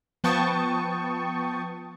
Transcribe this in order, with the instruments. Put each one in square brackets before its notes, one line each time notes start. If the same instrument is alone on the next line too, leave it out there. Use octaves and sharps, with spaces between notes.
[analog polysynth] F3 B3 G5 A5 C#6 D#6